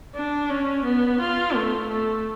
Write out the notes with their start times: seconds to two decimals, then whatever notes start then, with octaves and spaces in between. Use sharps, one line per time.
0.15 D4
0.50 C#4
0.85 B3
1.20 F4
1.55 A3
1.89 A3